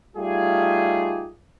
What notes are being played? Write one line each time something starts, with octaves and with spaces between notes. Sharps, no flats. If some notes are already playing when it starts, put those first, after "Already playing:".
G3 A3 D#4 F4 G4 G#4